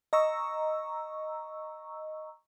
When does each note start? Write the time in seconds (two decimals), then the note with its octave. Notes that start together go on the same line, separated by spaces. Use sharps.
0.13 D#5 A#5 C#6 E6